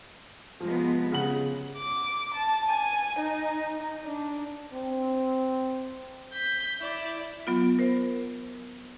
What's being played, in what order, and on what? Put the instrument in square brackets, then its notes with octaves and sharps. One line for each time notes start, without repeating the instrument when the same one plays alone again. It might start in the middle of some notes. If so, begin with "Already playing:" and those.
[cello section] C3 G#3 B3 [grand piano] F3
[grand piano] C#3 F#5 F#7
[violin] D6
A5
G#5
D#4
D4
[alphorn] C4
[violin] G6 B6
E4 D5
[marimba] F#3 B3 F4
A#4 C5